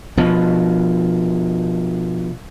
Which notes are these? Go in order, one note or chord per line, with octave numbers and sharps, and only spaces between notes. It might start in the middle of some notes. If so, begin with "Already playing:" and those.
B2 F3